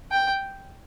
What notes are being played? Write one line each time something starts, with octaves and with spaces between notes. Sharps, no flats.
G5